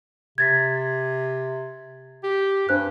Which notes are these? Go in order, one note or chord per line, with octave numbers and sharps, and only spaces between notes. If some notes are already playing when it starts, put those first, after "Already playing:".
C3 G#6 A6 B6
G4
G2 D4 C5 F#6